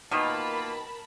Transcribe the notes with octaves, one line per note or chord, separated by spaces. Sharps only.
B2 D#3 A#3 F4 A#4 A5 B5